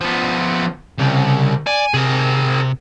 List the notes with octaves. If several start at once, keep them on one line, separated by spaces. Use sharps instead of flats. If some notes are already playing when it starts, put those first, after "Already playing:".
F3 B3
C2 C#3
D5 G#5
C3 G#4 A#4